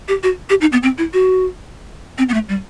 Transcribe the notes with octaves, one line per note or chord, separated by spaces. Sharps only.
G4
F#4
G4
D#4
B3
C4
E4
F#4
C4
B3
A3
G3